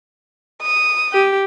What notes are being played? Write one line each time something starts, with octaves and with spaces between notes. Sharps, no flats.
D#6
G4